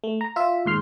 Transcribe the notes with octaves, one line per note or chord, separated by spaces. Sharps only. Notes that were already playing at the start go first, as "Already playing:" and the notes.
A3
A#5
F4 E5
D#2 G#2 C6 F6